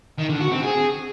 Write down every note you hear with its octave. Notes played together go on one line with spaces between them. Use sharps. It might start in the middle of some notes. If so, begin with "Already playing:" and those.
D#3
D3
F#4
C4
G#4